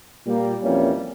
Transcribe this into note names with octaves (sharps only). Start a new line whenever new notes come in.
A#2 G3 A#3
F2 E3 G3 A#3 C#4